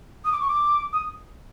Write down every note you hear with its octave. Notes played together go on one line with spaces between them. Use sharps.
D#6
D6
C#6
D6
D#6